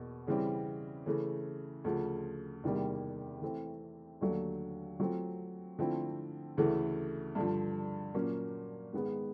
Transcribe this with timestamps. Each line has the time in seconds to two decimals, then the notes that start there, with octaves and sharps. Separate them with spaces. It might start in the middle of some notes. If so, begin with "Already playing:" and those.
Already playing: E2 B2 A#3
0.27 C#3 E3 G3 C4
1.06 C#3 E3 A3
1.84 D2 C#3 F3
2.63 E2 C3 D#3 G3 A#3
3.42 E3 A3 C4
4.21 D#2 D3 F#3 A3 D4
5.00 F#3 A3 C4 F4
5.79 D3 F3 A3 C4 E4
6.57 D2 C#3 E3 A3
7.35 G2 D3 F3
8.15 A#2 F#3 A#3 C#4
8.93 G#2 D#3 G#3 B3